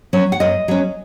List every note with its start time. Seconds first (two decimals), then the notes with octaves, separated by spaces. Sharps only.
0.13 F#3 C#4
0.32 F#5
0.40 F#2 D#5
0.68 F#3 C#4